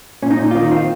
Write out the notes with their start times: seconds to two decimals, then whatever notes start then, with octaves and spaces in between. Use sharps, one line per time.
0.22 A#2 C#4
0.31 D#4
0.39 A#2
0.51 F4
0.55 D#3 D#4
0.71 C4 F4